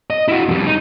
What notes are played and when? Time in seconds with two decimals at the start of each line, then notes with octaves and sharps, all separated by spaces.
0.10 D#5
0.28 E4 F#4
0.49 F2 G3
0.66 D#4